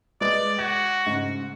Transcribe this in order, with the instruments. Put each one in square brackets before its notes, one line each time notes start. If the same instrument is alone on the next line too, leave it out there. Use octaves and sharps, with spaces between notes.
[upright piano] G#3 B4 A6 [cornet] D5
[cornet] F#4 [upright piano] G#6
[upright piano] G#2 C#3